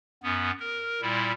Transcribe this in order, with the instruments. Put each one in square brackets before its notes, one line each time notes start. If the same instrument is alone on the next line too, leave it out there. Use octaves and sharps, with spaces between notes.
[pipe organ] F#2 B3
A#4
A#2 G3 E4